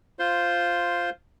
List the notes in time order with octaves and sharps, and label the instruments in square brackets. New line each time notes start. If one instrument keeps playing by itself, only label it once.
[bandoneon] F4 C5 C6